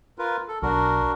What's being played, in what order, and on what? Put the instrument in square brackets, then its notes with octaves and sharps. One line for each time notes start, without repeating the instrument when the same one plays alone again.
[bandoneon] F4 A#4 B4
A4
[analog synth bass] B1 [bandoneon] D4 F#4 A#4